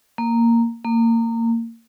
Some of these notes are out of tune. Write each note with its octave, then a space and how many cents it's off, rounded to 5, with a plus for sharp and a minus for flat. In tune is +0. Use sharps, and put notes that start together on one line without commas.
A#3 -10
A#3 -25